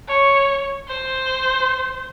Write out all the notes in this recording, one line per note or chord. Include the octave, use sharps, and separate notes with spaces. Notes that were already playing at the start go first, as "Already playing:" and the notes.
C#5
C5